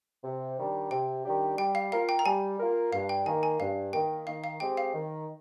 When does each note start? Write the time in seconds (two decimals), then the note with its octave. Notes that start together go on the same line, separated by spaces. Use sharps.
0.24 C3
0.57 D#3 G3 D4 G4
0.91 C3 G5
1.24 D#3 G3 D4 G4
1.58 G3 G5
1.75 F5
1.91 A#3 F4 A#4 F5
2.09 G5
2.19 A#5
2.25 G3 G#5
2.59 A#3 F4 A#4
2.93 G2 F5
3.09 G5
3.26 D#3 A#3 G#5
3.43 G#5
3.60 G2 F5
3.93 D#3 A#3 G5
4.27 D#3 F5
4.44 F5
4.60 G#3 C4 G4 G5
4.77 F5
4.94 D#3